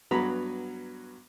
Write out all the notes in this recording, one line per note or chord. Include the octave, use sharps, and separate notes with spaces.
G2 F#3 B3 A#5 B5